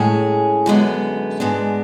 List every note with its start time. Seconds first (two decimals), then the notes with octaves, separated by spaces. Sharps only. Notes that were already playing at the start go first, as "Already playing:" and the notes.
Already playing: A2 G#3 C#4 G#4
0.66 F#2 D3 G#3 B3
1.40 G#2 G#3 B3 D4